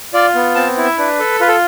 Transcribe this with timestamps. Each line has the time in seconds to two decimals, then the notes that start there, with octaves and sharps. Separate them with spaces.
0.14 F4 D5
0.35 B3
0.55 C4 A5
0.77 E4
0.84 E5
0.98 D4 B4
1.19 A4
1.40 F4 B4
1.48 A4